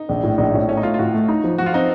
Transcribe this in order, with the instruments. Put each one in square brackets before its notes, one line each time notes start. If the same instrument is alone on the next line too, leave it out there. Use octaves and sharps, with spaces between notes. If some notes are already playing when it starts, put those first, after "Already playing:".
Already playing: [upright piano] D#4
[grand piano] A#1
A2
[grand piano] A#1 [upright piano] D#4
[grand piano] A2 [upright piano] C#4
[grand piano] A3 [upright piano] C#4
[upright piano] D#4
[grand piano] A3 [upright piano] F4
[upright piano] F4
[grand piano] A2 [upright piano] F#4
[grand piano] A3
D#4
F3
[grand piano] F3 [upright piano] F#4
[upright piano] F4
[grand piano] C4 [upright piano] D#4